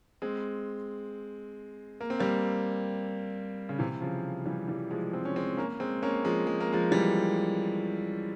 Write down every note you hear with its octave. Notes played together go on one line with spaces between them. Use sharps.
G#3 C4
A#3
C4
G3 A#3
C#3
C3 E3
C#3 F3
E3 G3
E3 G3
F3 G#3
G#3 C4
C#4
G#3 C4
A#3 C#4
G#3 C4
A#3 C#4
F3 G#3
G#3
A#3
F3 G#3
E3 G3